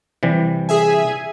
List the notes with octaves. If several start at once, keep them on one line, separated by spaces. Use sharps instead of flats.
C3 E3 G3
G#4 E5 G#5